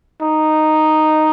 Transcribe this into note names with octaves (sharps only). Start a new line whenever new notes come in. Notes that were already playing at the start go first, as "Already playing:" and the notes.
D#4